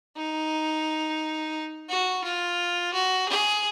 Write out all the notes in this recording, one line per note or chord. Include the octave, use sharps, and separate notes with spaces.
D#4
F#4
F4
F#4
G#4